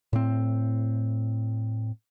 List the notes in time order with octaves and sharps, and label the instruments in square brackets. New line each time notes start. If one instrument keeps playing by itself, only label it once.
[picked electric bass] A2 C4